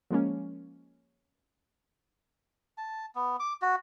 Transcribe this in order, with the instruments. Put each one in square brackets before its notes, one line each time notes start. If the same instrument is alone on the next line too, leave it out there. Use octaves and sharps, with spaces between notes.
[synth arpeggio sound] F3 G#3 A#3 C#4
[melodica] A5
B3
D6
F#4